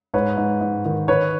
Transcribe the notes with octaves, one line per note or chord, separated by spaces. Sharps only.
G#2 B4 C#5
G#2
G#2
D#3
D#3 B4 C#5